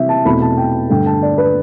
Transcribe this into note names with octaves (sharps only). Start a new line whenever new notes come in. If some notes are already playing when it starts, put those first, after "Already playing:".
Already playing: C3 E3 G3 C4 E5
A5
E2 B2 A3 C4 B5
A5
G5
G2 D3 A3 G5
A5
D5
B4